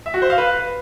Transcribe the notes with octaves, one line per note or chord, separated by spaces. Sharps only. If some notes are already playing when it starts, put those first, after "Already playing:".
E5
F#4
C5
F5
B4